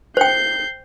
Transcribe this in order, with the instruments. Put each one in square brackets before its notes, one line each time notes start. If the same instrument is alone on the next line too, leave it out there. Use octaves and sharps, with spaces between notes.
[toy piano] C5 G5 [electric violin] G6 C7